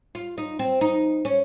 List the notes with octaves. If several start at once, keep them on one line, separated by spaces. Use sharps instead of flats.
F4
D#4
C4
D#4
C#4